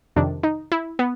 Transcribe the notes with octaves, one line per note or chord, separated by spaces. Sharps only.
F2 C3 D#3 D4
D#4
E4
B3